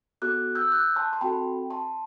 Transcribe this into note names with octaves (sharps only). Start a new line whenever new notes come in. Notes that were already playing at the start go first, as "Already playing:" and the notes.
B3 F#4 A4 D6 F#6
E6 G6
D6 F#6
A5 C6
C6
C4 F#4 A4 G5 B5
A5 C6